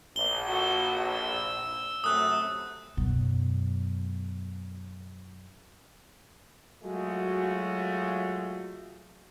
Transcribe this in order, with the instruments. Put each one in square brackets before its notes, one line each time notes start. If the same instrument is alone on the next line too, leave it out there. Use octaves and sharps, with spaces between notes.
[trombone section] A#1 [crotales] G7
[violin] F#4 A4
E6
[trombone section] F#2 C3 A3 [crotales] D#6 F#6
[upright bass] F#2 B2
[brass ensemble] F#3 G#3 A3 F4 F#4